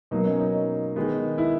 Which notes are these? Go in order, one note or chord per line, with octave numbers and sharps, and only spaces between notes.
B2 F#3 A#3 D#4
C#4
D#4
D#3 G#3 B3
E4